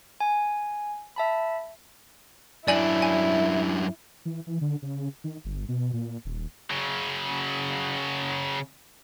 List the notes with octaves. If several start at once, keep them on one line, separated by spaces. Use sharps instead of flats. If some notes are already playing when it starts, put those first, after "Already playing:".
G#5
E5 A5 B5
F#2 D4 E4 D5 G#5 F#7
G#5
E3
E3
D3
C#3
D#3
G1
B2
A#2
D#1
C#3 F#3